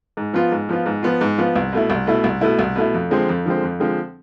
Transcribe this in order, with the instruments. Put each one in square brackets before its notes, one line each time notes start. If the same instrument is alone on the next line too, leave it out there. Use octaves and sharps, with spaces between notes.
[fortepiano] G#2
F3 B3 F4
G#2
F3 B3 F4
G#2
F3 B3 F4
G#2
F3 B3 F4
C2
B2 A3 E4
C2
B2 A3 E4
C2
B2 A3 E4
C2
B2 A3 E4
F2
D3 F3 G#3 C4
F2
D3 F3 G#3 C4
F2
D3 F3 G#3 C4